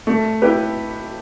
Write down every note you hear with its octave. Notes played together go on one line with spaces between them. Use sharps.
A3
E4 G4 B4